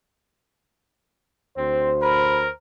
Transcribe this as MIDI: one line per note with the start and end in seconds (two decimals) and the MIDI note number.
1.57 2.50 38
1.57 1.92 60
1.57 2.50 72
2.02 2.49 70
2.02 2.38 83